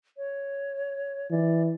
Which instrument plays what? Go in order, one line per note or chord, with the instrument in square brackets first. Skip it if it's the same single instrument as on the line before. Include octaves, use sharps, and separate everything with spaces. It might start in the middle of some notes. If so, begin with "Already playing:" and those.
[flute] C#5
[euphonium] E3 [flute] D5